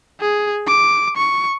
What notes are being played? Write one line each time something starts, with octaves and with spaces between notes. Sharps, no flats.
G#4
D6
C#6